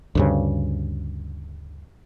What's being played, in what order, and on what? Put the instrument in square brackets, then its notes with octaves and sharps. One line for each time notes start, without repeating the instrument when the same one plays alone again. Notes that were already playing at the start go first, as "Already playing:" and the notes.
[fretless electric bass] D2 G2 C#3